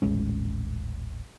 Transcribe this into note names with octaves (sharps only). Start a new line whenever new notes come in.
D#1 A1 G#3 C#4